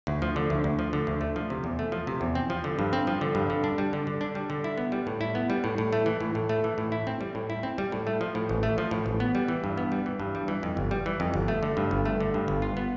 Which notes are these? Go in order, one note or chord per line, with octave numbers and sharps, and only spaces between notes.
D2
F3
D3
D2
D2
F3
D3
D2
A3
F3
C3
E2
A3
F3
C3
E2
C4
F3
D3
G2
C4
F3
D3
G2
D3
D4
G3
D3
D3
D4
G3
D3
E4
B3
G3
A2
E4
B3
G3
A2
A2
A3
E3
A2
A2
A3
E3
A2
E4
C4
G3
A2
E4
C4
G3
A2
A3
F3
A2
A1
A3
F3
A2
A1
B3
G3
E3
G2
B3
G3
E3
G2
G3
E3
F2
G1
G3
E3
F2
G1
A3
D3
G2
G1
A3
D3
G2
G1
F4
B3